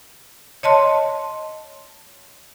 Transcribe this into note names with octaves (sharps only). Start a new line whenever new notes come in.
C#5 D#5 A5 C6